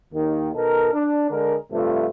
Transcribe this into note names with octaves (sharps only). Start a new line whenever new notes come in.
D#2 D#3
B2 D#4 A4 A#4
D4
D3 G#3 D4 A#4
G2 C3 F3 A3 F4